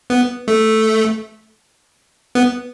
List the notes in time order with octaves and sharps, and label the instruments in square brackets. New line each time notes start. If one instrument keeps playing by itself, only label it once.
[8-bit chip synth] B3
A3
B3